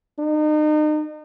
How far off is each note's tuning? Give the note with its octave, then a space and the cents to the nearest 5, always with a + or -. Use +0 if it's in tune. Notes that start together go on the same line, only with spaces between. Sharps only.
D#4 -35